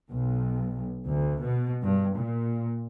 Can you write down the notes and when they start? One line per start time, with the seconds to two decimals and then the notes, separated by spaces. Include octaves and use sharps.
0.12 B1
1.10 D2
1.41 B2
1.84 G2
2.16 A#2